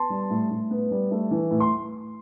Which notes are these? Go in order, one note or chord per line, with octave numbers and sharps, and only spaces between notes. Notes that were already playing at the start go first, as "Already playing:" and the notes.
Already playing: B3 A5 C6
G3
A2
A2
B3
G3
A3
E3
A2
C6